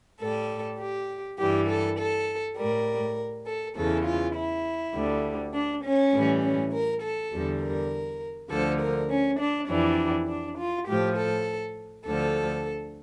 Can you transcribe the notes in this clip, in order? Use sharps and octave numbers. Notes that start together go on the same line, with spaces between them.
A2 G3 A4
G4
G2 E3 G3 G4
A4
A4
A2 G3 A#4
A4
E2 C#3 E3 A4
F4
E4
D2 D3 G3
D4
C#4
A2 E3 G3
C#4
A#4
A4
E2 D3 G3
A#4
D2 D3 F3 A4
A#4
C#4
D4
F2 E3 G3 D4
D4
F4
A2 F3 G4
A4
D2 D3 F3 A4